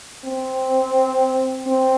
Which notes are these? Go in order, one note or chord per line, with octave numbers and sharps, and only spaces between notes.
C4
C4